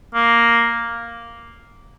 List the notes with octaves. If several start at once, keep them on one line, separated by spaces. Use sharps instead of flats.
A#3